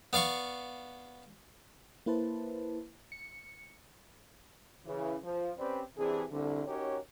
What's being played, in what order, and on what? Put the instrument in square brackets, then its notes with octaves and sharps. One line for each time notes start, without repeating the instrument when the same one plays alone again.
[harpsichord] B3 D5 F5 C#6
[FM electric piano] A#3 E4 B4 C5 A5
C#7
[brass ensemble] C#3 E3
F3
C4 C#4 G4 B4 C5 D5
C3 E3 D4 G#4
C2 D3
C#4 D#4 F#4 G4 A#4 C#5